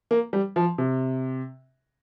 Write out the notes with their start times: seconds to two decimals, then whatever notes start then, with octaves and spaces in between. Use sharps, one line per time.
0.11 A#3
0.33 G3
0.56 F3
0.78 C3